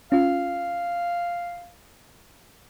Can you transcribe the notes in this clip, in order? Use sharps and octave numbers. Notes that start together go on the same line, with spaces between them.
C#4 F4 F5